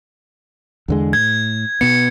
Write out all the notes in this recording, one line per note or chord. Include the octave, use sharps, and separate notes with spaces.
E2 D3 G#3
A2 G#6
B2 B3 C#7